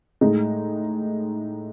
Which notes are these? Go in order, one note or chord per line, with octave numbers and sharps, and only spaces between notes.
A2 G#3 D#4